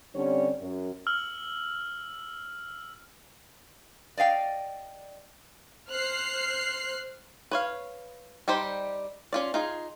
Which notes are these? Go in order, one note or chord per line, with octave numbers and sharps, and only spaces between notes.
D3 G3 C4 C#4 C#5 D5
F#2
E6 F6 F#7
D5 D#5 F5 G5
C5 F6 F#6 C7
B4 C#5 F5
G3 D#4 G4 C5
C#4 F4 D5
D#4 F4 G#4